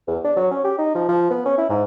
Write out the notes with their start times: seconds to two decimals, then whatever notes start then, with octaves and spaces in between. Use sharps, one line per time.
0.08 E2
0.25 D4
0.37 F#3
0.51 C#4
0.64 G4
0.78 D#4
0.95 F3
1.09 F3
1.31 B3
1.46 C#4
1.58 E4
1.70 G#2